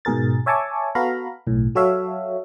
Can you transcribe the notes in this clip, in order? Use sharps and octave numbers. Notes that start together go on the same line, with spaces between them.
G#2 B2 G#4 A#4 A6
C#5 E5 G#5 A5 C#6 D6
B3 F#4 A4 F5 A#5 B5
B1 A2
F#3 F#4 A4 C#5 E5 F5